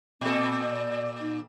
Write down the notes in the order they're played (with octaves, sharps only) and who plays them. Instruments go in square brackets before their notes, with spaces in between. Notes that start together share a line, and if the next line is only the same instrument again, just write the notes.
[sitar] A#2 A4 [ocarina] C4
[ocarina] D5
D#4